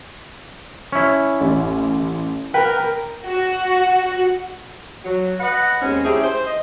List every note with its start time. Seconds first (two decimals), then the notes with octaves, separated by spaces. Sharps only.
0.92 C#4 E4
1.41 A1
2.54 A#4 B4 G5
3.26 F#4
5.04 F#3
5.40 B4 D#5 F#5
5.81 D#2 G#3 C4 C#4
6.04 A3 C#4 E4 G4 G#4
6.23 C5
6.46 D#5